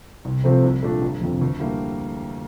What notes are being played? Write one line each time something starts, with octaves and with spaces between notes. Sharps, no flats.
C2
C3 F3 A3 C4
C2
A#2 A3 D4
G1
F2 C3
D2
D3 G3 A#3 E4